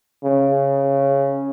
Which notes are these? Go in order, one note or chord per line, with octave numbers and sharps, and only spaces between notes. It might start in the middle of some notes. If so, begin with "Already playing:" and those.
C#3